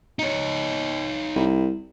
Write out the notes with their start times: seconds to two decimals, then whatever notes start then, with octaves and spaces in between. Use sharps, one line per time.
0.19 D#4 C#5
1.36 C2